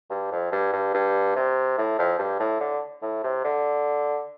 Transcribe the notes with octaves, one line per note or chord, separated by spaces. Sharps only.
G2
F2
G2
G2
G2
C3
A2
F2
G2
A2
D3
A2
C3
D3